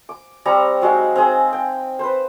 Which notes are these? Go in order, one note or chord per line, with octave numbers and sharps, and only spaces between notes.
D6
G3 C4 A#5 C#6
F#3 G#3 D#4 F5
C4 G#4
G5
B4 C5